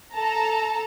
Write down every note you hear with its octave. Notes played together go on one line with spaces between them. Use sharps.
A4 A5 A#5